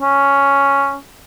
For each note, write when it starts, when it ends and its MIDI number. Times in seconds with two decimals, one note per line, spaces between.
0.01 0.97 61